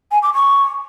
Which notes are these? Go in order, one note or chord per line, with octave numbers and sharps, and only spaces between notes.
G#5
D6
C#6